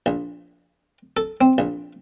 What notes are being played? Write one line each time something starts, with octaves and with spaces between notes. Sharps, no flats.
A#1
A4
C4
A#1